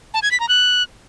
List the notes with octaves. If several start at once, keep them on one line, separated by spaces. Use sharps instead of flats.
A5
G#6
B6
A#5
F#6